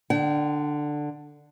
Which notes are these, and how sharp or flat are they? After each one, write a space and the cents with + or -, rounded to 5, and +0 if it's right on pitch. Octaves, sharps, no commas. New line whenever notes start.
D3 +10 G5 -40